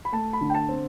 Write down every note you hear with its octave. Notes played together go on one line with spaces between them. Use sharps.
B5
A3 A5
B5
D3
G5
A5
C4